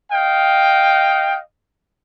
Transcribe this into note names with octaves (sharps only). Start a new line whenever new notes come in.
D#5 F5 G5